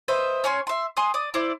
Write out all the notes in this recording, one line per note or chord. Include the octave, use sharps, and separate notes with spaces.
B4 C5 D#5 E5
C#4 C#5 G#5 C6
E5 C6
G#5 C6 D#6
D5 D#6
E4 C5 D5